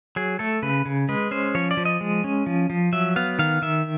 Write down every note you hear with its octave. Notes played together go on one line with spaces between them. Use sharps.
F#3 G#4
A3 A4
C#3 B4
C#3
G#3 B4
C#4 C5
F3 C#5
D5
F3
D#5
G#3
C#4
F3
F3
F#3 E5
B3 F5
D#3 F5
D#3 E5